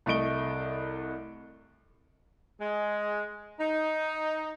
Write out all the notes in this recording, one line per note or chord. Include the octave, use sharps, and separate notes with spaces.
C2 A3 D#5 D7 G7
G#3
D#4